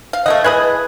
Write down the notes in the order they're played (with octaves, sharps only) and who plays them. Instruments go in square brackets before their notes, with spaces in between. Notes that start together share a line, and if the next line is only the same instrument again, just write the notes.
[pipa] F5
[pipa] A3 A#3 F#5 [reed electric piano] D#5
[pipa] E3 G#3 D#5 [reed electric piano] B4 F#6 G#6